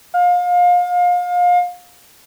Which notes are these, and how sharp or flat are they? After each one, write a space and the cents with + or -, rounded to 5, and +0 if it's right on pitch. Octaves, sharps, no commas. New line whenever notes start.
F5 +30